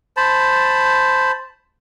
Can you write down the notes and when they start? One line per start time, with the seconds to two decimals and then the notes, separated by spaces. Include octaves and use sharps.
0.17 C5 A5 B5